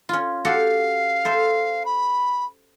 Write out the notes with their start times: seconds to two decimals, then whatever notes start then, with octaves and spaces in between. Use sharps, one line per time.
0.09 C#4 F4
0.45 F#4 G4 A4 F5
1.25 A4 C5 E5
1.85 B5